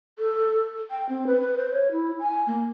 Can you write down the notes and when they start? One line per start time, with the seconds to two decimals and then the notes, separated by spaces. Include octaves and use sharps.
0.19 A4
0.91 G5
1.09 C4
1.27 B4
1.41 B4
1.57 C5
1.72 C#5
1.92 E4
2.20 G#5
2.47 A#3